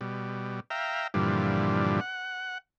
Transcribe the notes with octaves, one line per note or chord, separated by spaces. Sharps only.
B2 G3
E5 F5 G5 A#5
G2 A#2 D3 E3 F3 G3
F#5